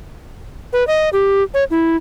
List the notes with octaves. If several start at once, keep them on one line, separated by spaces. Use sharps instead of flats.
B4
D#5
G4
C#5
E4